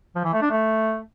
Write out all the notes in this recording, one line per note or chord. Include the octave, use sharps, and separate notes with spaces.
F3
E3
A3
D4
A3